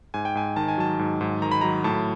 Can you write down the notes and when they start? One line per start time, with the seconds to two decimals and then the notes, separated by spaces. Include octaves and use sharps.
0.14 G#2 G#5
0.25 G5
0.35 G#2 G#5
0.56 D#3 A5
0.68 G#5
0.78 F#3 A5
0.99 G#2
1.21 G#2
1.42 D#3 A#5
1.52 B5
1.61 F#3 A#5
1.84 A2 A5